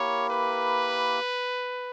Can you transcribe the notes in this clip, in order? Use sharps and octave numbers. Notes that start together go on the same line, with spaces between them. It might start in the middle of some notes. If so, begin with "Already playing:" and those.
Already playing: A#3 E4 G4 A#4 C#5
B4